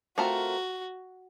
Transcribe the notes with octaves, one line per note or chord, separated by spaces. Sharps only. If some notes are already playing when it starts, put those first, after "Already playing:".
A3 C4 F4 F#4 A#4